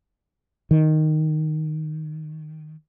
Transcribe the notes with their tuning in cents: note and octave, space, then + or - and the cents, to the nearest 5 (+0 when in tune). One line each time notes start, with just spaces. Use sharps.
D#3 -5